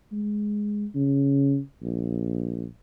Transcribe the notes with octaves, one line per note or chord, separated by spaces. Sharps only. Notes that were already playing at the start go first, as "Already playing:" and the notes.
G#3
C#3
A#1